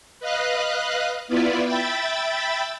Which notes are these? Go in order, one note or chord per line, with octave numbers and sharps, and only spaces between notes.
B4 D#5 F5 F#6
B3 E4 F4 B4 D5
E5 G5 B5 A6